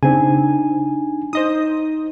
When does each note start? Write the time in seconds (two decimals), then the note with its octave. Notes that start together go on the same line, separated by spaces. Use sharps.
0.03 C#3 C4 D4 D#4 G#5
1.33 D#4 C5 D#5 D#6